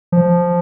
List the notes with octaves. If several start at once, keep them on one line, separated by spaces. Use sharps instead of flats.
F3